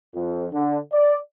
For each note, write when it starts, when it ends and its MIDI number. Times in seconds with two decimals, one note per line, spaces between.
0.15 0.47 41
0.52 0.77 50
0.92 1.15 74